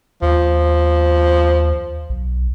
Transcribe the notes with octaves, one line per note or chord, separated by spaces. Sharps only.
D#2 F3
B1